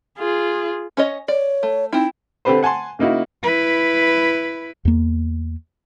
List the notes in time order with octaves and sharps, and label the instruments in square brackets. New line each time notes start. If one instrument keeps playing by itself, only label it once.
[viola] F4 G#4
[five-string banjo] C#4 C#5 D#5
[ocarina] C#5 [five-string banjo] D5
[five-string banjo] A3
[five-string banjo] C4 E4 [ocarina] D#4
[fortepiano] D3 A3 C4 G4 B4 C5
F#5 G#5 A5 C6
C#3 A#3 D#4 E4 F#4
[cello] E4 B4
[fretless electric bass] E2 A#3